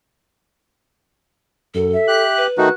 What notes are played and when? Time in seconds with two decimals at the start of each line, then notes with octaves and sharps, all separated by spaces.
1.74 F#2 A4
1.94 E5
2.08 G4 F#6
2.37 B4
2.58 D#3 A3 D#4 F#4 F#6